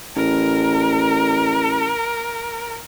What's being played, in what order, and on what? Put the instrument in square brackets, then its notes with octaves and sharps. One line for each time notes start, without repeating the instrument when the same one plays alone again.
[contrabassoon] A1 [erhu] A#4